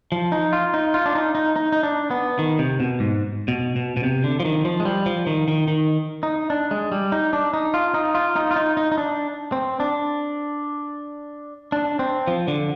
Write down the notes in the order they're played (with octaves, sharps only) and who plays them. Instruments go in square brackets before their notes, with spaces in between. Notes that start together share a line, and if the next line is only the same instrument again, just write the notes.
[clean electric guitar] F3
D#4
F4
D#4
F4
D4
D#4
D#4
D#4
D#4
D4
B3
D#3
C3
B2
G#2
B2
B2
B2
C3
D3
F3
D#3
F3
G#3
G3
F3
D#3
D#3
D#3
D#4
D4
G#3
G3
D#4
D4
D#4
F4
D#4
F4
D#4
F4
D#4
D#4
D#4
D4
C4
D4
D4
C4
F3
D3